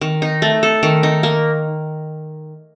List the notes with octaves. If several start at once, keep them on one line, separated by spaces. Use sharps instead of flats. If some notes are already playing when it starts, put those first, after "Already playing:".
D#3
D#4
A3
A4
D#3
D#4
A#3